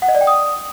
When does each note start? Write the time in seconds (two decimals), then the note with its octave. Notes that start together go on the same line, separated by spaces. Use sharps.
0.02 F#5
0.08 D#5
0.15 D5
0.21 G5
0.27 D#6